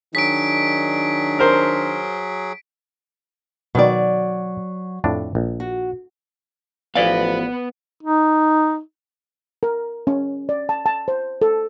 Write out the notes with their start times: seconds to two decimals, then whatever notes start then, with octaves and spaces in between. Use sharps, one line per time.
0.15 D#3 F#3 D4 G#4 B6 D7
1.39 A#4 C5
3.75 B2 D#3 F#3 D5
5.04 F2 A2 D4
5.35 A#1
5.60 F#4
6.95 A1 F3 B3 B4 D5 F5
8.03 D#4
9.63 A#4
10.07 C#4
10.49 D5
10.69 A5
10.86 A5
11.08 C5
11.42 A4